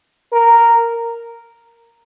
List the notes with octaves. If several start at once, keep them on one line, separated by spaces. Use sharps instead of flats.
A#4